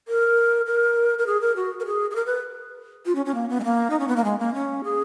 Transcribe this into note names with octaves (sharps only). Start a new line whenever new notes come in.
A#4
A#4
A#4
G#4
A#4
F#4
A#4
G#4
G#4
A#4
B4
F4
C#4
C#4
A#3
B3
G#3
A#3
D#4
C#4
B3
A#3
G#3
A#3
C#4
G#4